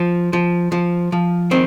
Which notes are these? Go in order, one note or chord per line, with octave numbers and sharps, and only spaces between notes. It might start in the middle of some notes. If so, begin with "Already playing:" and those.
Already playing: F3
F3
F3
F3
D#3 C4